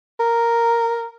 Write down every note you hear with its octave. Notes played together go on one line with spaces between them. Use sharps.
A#4